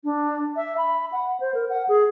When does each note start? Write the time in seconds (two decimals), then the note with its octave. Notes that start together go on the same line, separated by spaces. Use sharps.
0.04 D4
0.56 E5
0.77 B5
1.12 F#5
1.40 C5
1.54 A#4
1.69 F#5
1.88 G#4